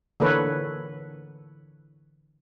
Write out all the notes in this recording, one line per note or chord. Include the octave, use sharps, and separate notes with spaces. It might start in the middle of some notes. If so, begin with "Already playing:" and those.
D3 E3 A#3 A4 B4 C#5